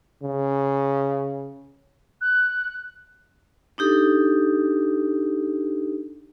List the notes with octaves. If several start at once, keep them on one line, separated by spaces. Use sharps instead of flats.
C#3
F#6
D4 D#4 G4 A4